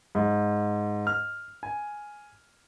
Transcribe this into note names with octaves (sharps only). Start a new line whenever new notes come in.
G#2
F6
G#5